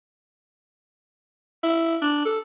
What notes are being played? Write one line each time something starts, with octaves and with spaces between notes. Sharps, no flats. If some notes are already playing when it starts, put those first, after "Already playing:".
E4
D4
A4